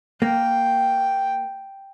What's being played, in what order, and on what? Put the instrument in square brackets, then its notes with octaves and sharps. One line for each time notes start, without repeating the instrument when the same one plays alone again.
[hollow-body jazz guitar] A#3 [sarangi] G5